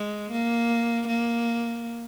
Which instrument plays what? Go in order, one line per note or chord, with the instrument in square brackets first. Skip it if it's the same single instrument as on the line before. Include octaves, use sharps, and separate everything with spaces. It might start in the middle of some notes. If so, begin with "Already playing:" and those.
Already playing: [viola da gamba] G#3
A#3
A#3